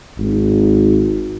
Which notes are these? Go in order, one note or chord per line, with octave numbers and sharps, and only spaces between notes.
G#1